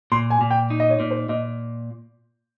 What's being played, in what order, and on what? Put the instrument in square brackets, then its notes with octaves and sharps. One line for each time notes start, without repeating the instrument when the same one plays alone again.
[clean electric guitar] A#2 [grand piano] C6
[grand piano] G#5
[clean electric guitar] A#2
[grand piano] G5
[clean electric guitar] D#4
[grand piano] D#5
C#5
[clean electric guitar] A#2
[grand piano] C5
[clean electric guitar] A#2 [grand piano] D#5